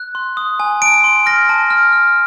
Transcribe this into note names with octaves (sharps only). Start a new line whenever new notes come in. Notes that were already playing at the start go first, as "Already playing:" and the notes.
Already playing: F#6
C6
D#6
G#5
A5 D7
C6
F6 A#6
A5
F6
F6